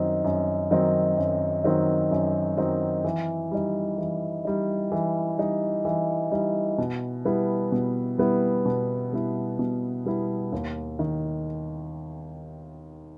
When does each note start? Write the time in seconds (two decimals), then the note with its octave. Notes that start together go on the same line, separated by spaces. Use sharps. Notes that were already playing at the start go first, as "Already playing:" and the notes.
Already playing: F#2 D#3 F#3 C4 D#4
0.24 F#2
0.71 D#3 F#3 C4 D#4
1.17 F#2
1.64 D#3 F#3 C4 D#4
2.11 F#2
2.57 D#3 F#3 C4 D#4
3.05 E3
3.51 G3 D#4
3.98 E3
4.45 G3 D#4
4.92 E3
5.38 G3 D#4
5.85 E3
6.32 G3 D#4
6.78 B2
7.25 G3 B3 E4
7.72 B2
8.18 G3 B3 E4
8.65 B2
9.12 G3 B3 E4
9.59 B2
10.05 G3 B3 E4
10.52 D#2
10.99 D#3